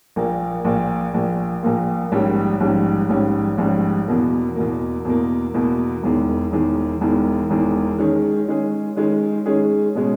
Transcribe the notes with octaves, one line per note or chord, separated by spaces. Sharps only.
A#1 A#2 A#3
A#1 A#2 A#3
A#1 A#2 A#3
A#1 A#2 A#3
A#1 G#2 G3 C#4
A#1 G#2 G3 C#4
A#1 G#2 G3 C#4
A#1 G#2 G3 C#4
E2 B2 A#3
E2 B2 A#3
E2 B2 A#3
E2 B2 A#3
E1 E2 D#3
E1 E2 D#3
E1 E2 D#3
E1 E2 D#3
D#3 G#3 C#4 G#4
D#3 G#3 C#4 G#4
D#3 G#3 C#4 G#4
D#3 G#3 C#4 G#4
B2 G#3 C#4